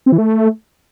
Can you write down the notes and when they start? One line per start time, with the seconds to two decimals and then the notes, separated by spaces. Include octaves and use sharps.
0.06 C4
0.12 E3
0.18 A3